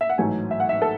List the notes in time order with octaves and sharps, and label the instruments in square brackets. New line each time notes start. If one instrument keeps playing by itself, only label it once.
[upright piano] E5
F#5
A1 G#2 F#3 A3 G#5
E5
F#5
E5
A4